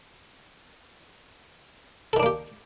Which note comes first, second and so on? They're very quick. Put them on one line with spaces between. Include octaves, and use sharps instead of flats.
A4 D#3 D4 A#3 G4